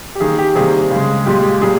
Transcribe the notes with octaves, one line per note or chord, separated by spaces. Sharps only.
G4
D#3 A#3 G#4
G4
C3 D#3 G3 A#3 G#4
C#3 G#3
A#2 G#3 G4
A#2 G3 A#3 G#4